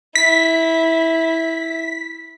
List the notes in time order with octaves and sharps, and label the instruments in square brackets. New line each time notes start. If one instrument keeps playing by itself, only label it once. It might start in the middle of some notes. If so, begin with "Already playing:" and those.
[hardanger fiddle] E4 [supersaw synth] B6